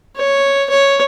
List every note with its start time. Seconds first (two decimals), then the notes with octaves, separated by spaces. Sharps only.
0.17 C#5
0.70 C#5